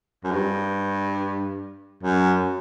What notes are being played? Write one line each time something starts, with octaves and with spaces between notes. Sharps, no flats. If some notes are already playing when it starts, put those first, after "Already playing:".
F#2
G2
F#2